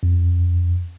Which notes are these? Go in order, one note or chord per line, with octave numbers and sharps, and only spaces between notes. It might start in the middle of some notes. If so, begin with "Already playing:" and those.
F2